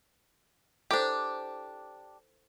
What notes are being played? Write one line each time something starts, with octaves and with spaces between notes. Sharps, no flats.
D4 E4 G4 A4 C5